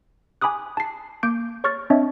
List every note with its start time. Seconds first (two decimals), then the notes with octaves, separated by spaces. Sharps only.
0.41 G#5 B5 D6 D#6 F#6
0.77 A5 C7
1.23 A#3 D6 G6 D7
1.64 C#5 C#6 F6 A6
1.90 C4 D4 C#5 D#5 E5